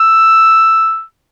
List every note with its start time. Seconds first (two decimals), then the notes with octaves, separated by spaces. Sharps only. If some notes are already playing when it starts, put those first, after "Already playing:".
Already playing: E6